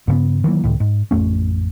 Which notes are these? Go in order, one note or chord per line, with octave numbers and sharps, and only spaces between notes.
G2 C#3 B3
D#3 E3 F#3 A#3
C#2 A2 D#3
G#2
A1 F2 A3 C#4